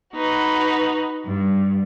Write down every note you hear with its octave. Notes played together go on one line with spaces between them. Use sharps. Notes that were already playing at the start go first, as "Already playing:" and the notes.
D#4 F#4 B4
G2